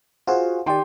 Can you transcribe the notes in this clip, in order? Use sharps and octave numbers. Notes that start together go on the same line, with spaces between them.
F4 F#4 G#4 C5
D#3 G4 D5 G5 C6